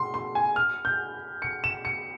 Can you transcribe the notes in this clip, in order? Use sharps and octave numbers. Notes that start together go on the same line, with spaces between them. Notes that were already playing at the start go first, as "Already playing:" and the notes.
Already playing: C6
C6
G#5
F6
G6
C#7
E7
C#7